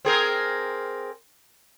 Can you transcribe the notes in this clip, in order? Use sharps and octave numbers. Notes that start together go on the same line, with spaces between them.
C4 G#4 A#4